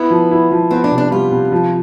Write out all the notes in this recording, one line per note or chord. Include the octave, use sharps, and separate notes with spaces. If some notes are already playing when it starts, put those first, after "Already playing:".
Already playing: B3 E4
F3
E4
F3
B3 C4
D4
C3
D4
G3 F4
C3
F3